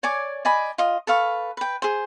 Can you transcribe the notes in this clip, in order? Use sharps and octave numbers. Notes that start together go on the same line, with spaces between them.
C#5 D5 G#5 D6
D5 D#5 G#5 B5
F4 D#5
A4 B4 F5 C#6
B4 G5
G#4 C5